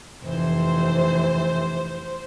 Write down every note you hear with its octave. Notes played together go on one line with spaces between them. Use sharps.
F1 E3 C5